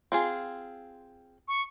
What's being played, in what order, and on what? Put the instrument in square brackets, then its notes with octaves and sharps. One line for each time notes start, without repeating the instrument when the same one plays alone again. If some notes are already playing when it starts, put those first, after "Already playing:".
[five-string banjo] C4 F4 G#4
[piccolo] C#6